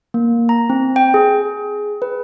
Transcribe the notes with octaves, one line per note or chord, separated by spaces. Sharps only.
A#3
A#5
C4
G5
G#4
B4